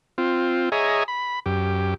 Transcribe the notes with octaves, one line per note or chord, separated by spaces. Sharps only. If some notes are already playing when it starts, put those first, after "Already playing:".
C4 F4
G#4 C#5 D#5 E5 G#5 A#5
B5
F#2 G4